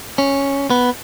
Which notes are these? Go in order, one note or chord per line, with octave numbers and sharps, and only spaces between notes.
C#4
B3